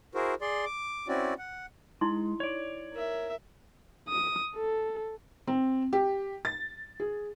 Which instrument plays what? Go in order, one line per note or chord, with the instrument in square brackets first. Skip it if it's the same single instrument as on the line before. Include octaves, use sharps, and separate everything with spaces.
[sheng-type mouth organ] E4 F#4 G#4 A#4 C5
G#4 D5 C6
D6
C4 C#4 E4 F#4 D5
F#5
[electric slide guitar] G#3 [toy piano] D#4 E4 C6
[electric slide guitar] C#5 D5
[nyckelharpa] A#4 E5
[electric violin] D#6
A4
[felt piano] C4
G4
A6
G#4